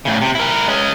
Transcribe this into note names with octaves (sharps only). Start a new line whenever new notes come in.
A2 C#3
C3
E4 A#4
G#3 C#4